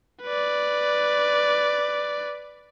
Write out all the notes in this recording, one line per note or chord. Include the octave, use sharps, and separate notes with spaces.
B4 D5